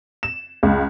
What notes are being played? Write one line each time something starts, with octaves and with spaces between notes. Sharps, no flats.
E7
C#2